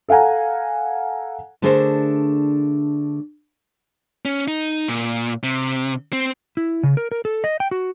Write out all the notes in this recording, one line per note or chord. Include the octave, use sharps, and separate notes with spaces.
A4 F5 F#5 G#5 A#5
D3 A3 D4 G#4 A#4 C5
C#4
D#4
A#2
C3
C4
E4
C#3
A#4
A#4
A4
D#5
G5
F#4